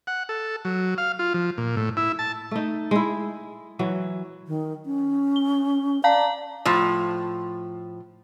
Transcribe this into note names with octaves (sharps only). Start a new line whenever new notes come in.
F#5
A4
F#3
F5
F4
F3
A#2
A2
E4
A5
A3 D#4
G#3 E4
E3 F#3
D#3
C#4
G7
D5 F5 A5 A#5
A2 F3